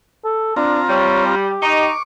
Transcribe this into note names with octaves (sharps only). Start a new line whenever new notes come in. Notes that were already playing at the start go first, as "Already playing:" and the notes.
A4
C4 D4 F4 A#5
G3 C#5
G4
D#4 C#6 D6